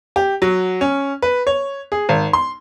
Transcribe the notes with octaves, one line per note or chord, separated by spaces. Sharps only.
G4
F#3
C#4
B4
C#5
G#4
G#1
C6